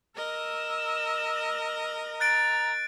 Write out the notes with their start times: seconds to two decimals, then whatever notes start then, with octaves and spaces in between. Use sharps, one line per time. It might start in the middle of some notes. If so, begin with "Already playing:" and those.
0.16 A#4 D#5 E6
2.20 A#5 F#6 A6 D7